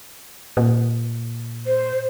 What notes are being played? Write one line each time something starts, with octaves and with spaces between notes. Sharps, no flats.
A#2
C5